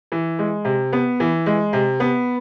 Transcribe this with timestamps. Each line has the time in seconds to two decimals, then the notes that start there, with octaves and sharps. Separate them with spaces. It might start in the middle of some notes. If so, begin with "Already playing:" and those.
0.12 E3
0.39 G#3
0.65 C3
0.93 B3
1.20 E3
1.46 G#3
1.73 C3
2.00 B3